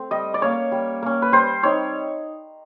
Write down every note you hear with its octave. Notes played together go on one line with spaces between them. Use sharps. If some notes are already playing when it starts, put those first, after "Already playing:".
Already playing: A3 C4
G3 D#5
D5
A#3 C#4 C#5
G3
A#3 C#4
B4
G3 C5
C4 D#4 C#5